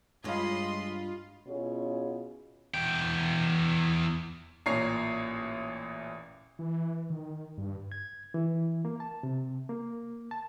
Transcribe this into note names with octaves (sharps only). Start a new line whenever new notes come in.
G2 G#3 F4 C#5 D#5 F5 B5 C6
B2 C#4 E4 F4 G#4 C#5
E2 G5
A1 A#2 C#5 A#5 C7
E3
D#3
G2
G#6
E3
A#3
A5
C3
A#3
A5